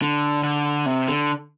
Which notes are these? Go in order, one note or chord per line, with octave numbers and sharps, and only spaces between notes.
D3
D3
C3
D3